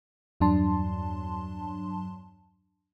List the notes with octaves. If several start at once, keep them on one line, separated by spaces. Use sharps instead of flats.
E2 G2 F#3 D4 A5 C6